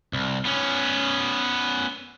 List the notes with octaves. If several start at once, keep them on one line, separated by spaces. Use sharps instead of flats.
C2
B3 C#4